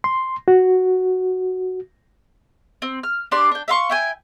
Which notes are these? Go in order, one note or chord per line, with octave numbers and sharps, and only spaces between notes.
C6
F#4
C4
F6
D4 G4 D5 C6
D4 G5
E5 F5 C6 C#6
E4 G5 G#5